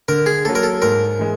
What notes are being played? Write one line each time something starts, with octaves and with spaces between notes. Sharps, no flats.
D3 A#4
G#4
F#3 A#3 A4
A#4
A4
G#2 A#4
E3 G#3